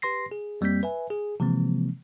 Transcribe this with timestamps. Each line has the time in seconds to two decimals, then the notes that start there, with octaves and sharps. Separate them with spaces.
0.02 G4 B4 C6 A#6 C7
0.31 G#4
0.61 F2 G3 A#3 C4 G6 B6
0.83 B4 E5 G#5
1.10 G#4
1.40 C3 E3 F3 G#3 A#3 C4